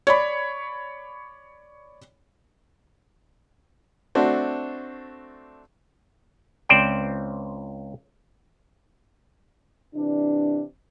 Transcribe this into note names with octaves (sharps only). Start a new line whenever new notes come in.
C#5 D5 B5
A3 C4 D4 F#4 C5
C#2 C4 C5 D5 G5
C3 E3 D4